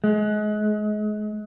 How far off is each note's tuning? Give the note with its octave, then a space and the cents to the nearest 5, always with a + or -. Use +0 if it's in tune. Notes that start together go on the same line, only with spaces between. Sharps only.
G#3 +30